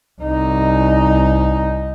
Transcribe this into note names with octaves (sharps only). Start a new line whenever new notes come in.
C2 D#4